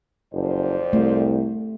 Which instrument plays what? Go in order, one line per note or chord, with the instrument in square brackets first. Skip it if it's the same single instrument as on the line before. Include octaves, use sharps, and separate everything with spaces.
[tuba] F#1 [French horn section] F2 C5 D5
[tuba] C2 [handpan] A3